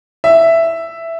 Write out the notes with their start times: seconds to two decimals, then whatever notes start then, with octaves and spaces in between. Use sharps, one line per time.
0.24 E5